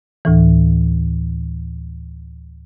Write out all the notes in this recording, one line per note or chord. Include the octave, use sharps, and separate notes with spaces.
D2 A2 E3